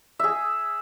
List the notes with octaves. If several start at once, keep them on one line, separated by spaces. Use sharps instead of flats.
G#4 E5